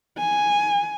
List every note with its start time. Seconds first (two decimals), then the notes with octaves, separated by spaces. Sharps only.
0.18 G#5